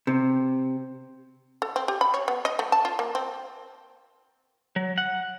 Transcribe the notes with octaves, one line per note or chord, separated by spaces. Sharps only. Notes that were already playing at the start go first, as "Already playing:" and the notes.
C3
A4
C4
G4
B5
C#5
B3
D#5
A3
A5
F4
A#3
C4
F#3
F#5